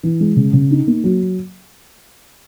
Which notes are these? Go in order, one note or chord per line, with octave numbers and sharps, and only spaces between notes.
E3
G#3
C#3
C#3
D#4
A#3
F#3